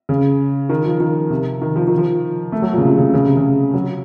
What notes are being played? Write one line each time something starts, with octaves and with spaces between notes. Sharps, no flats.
C#3
D#3
F3
D#3
C3
D#3
F3
D#3
F3
A3
F#3
A#2
C#3
C3
C#3
C#3
C3
C#3
F#3